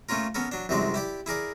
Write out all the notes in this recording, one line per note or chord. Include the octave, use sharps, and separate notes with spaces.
A3 A#3 C#4 F4 A#4
B3 C#4 A4 A#4
F#3 D4
C2 F#2 F#3 G#3 C4 D5
E4 G4 D5
E4 G#4 A#4 D5